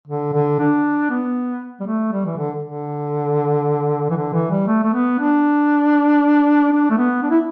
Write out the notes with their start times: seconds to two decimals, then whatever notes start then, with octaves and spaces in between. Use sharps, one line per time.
0.08 D3
0.33 D3
0.59 D4
1.10 B3
1.80 G3
1.87 A3
2.12 G3
2.26 E3
2.38 D3
2.63 D3
4.11 E3
4.16 D3
4.33 E3
4.51 G3
4.67 A3
4.83 A3
4.93 B3
5.19 D4
6.72 D4
6.90 A3
6.98 B3
7.23 D4
7.30 E4